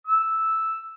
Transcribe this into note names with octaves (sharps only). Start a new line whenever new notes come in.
E6